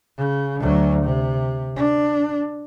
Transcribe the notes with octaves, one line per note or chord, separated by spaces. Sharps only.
C#3
D2 F#3
C3
D4